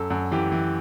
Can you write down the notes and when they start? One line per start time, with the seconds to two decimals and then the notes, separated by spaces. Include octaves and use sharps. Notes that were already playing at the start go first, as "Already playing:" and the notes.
Already playing: F#2 A4
0.10 F#2
0.32 E3 G4
0.52 E3